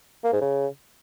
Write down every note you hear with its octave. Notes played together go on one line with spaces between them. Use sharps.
A#3
G#2
C#3